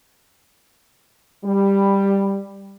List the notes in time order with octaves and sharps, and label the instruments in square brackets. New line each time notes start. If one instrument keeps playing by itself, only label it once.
[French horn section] G3